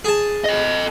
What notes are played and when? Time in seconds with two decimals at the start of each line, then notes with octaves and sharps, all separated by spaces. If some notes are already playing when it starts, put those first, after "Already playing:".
0.04 G#4 A5
0.46 A4 D#5